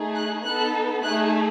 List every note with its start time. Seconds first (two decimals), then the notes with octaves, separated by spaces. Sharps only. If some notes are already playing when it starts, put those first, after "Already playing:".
Already playing: A3 D#4 G#4
0.15 F#6
0.44 B3 D#4 A4 F#6
1.03 A3 D#4 G#4 F#6